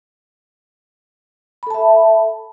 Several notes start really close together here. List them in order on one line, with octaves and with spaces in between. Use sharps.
B5 A4 A5 E5